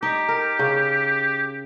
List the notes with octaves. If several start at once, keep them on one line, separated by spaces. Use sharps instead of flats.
D#4 G4
A#4
C#3